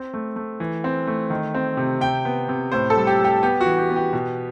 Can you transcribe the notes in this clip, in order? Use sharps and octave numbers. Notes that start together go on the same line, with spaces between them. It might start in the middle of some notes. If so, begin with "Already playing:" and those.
Already playing: C4
A3
A3
E3
C4
A3
D#3
C4
C3
C3 G5
B3
C3
A2 C5
A4
G3
G4
G3
G4
B3 G4
F#4
E3
G4
B3
G4
B2